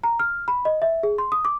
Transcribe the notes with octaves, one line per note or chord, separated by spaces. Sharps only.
A#5
F6
B5
D#5
E5
G#4
C6
D#6
D6